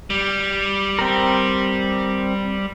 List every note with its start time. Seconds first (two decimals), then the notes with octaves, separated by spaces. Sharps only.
0.10 G3
0.99 C4 A#4